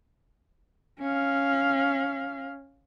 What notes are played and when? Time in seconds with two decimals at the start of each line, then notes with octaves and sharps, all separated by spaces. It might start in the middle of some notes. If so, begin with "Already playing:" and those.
1.00 C#4 F5